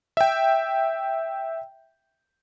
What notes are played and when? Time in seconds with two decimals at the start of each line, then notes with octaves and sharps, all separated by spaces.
0.17 E5 G5